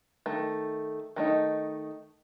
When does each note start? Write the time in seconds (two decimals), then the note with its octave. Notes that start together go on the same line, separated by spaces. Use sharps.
0.26 D#3 A3
1.16 D#3 A3 D#4